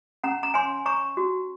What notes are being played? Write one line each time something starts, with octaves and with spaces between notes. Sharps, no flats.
C#4 F#5 A#5
A#5
C#5 G#5 C6
C#5 A#5 C#6
F#4